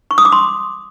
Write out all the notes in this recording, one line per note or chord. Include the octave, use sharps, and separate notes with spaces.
C#6
D#6
D6
C6